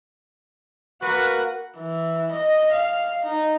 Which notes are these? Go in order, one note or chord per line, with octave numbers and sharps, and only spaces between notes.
A#3 F#4 B4 F#5
E3
D#5
F5
D#4